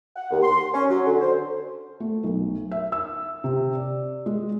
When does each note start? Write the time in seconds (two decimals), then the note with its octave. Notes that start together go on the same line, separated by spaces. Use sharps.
0.16 F#5
0.31 D#2
0.43 C6
0.74 C#4
0.89 F#3
1.06 D3
1.21 C5
2.00 A3
2.24 B1
2.71 E5
2.92 E6
3.44 C3
3.75 D5
4.26 G#3